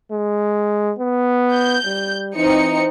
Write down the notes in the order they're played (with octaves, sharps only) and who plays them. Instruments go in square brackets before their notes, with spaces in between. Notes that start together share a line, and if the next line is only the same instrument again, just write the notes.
[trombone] G#3
B3
[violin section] G6
[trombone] G3
[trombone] E3 [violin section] C4 D#4 C#7